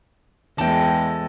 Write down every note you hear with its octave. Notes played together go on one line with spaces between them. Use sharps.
E2 G#3 A4 G5